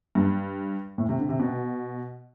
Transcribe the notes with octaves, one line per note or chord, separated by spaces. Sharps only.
G2
A2
C3
D3
C3
B2